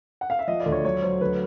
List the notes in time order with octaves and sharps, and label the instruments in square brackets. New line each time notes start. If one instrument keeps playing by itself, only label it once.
[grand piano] F#5
F5
E5
F3 D#5
D5
D2
C#5
F#3 C#5
F#3 C5
D2 B4